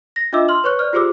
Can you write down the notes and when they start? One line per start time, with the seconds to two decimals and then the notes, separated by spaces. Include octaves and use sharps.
0.16 A#6
0.33 D4 F4 D#5 E5 D6 E6
0.48 C6 F6 F#7
0.64 B4 C#5 C#6 F#6
0.79 C5 D5 F6
0.93 F4 G4 G#4 C5 D6 E6